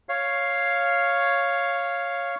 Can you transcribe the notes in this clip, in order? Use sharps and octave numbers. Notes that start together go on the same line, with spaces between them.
C#5 F5